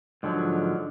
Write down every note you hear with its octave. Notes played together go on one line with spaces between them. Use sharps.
G#2 D3 F3 F#3